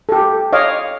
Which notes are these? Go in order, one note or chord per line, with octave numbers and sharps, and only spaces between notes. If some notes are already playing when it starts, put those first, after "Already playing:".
G4 A4
C#5 D#5 F5 D6